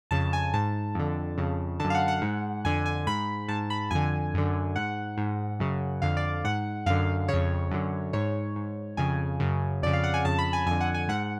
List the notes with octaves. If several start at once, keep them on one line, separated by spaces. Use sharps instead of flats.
F2 C#3 A5
G#5
G#2 A5
F2 D3
F2 C#3
F#2 D3 A5
F5
F#5
F#5
G#2
F2 D3 G#5
G#5
G#2 B5
G#2 A5
B5
F2 D3 G#5
F#2 D3
G#2 F#5
G#2
F#2 C#3
F2 D3 F5
D5
G#2 F#5
F#2 D3 F5
F2 C#3 C#5
F#2 D3
G#2 C#5
G#2
F2 C#3 G#5
F#2 C#3
F2 C#3 D5
F5
F#5
G#5
F2 C#3 A5
B5
G#5
F2 D3 G#5
F#5
G#5
G#2 F#5